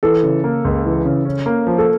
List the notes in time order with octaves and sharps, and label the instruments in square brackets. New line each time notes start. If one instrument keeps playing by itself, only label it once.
[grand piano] E3 [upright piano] A4
[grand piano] C#3
A#3
C#2
E3
C#3
C#4
A#3
F3
[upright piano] A4